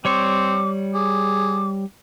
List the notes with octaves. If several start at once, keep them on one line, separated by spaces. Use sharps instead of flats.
G3 C4 C#5 C#6 D6
G#4 D6